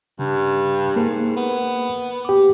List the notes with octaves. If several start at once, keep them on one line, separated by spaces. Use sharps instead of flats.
G2 C#3
G#2 A#3
B3
G4 D6